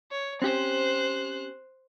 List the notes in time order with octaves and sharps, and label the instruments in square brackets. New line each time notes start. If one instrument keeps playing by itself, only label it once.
[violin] C#5
[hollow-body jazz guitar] C4 C#4 G4 [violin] C5 F#6